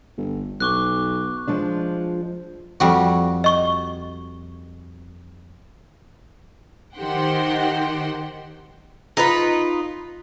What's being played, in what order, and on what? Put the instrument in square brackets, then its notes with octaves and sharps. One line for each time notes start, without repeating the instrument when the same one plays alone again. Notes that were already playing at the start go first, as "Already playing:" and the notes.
[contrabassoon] G1
[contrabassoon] B1 [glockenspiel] C#6 D6 F#6
[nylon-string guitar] F3 G#3 D4
[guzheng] F2 G3 F#4
[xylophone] D#5 C#6 G7
[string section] D#3 G4 C5 F#5 G5 C6
[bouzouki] D#4 F4 B4